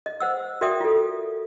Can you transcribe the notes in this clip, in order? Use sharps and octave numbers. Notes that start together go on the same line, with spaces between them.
D#5
C5 F#5 E6
F#4 A#4 D5 E5 G5 D#6
F4 A4